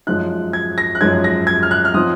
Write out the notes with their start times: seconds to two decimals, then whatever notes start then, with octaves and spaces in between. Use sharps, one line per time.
0.07 F#2 F3 G#3 D#4 F#6
0.53 G#6
0.78 A#6
0.95 F#6
1.01 F#2 F3 G#3 D#4 G#6
1.24 A#6
1.47 G#6
1.63 F6
1.71 F#6
1.85 F6
1.94 F3 C4 D#4 D#6